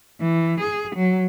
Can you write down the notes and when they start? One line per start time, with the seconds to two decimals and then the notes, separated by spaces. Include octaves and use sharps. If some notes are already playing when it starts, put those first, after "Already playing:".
0.21 E3
0.59 G#4
0.95 F#3